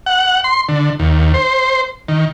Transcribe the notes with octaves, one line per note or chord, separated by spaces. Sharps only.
F#5
C6
D3
D#2
C5
D#3